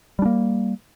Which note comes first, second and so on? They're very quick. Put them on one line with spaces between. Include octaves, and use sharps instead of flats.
G3 D4 A#3